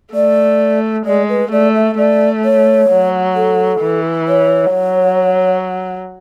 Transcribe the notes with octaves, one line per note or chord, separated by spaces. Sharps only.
A3 D5
G#3 D5
B4
A3 D5
E5
A3 D5
C#5
F#3
A4
E3
C#5
F#3